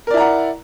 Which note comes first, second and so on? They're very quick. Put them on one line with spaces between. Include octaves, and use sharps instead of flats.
A#4 D5 E4 A#5 F#5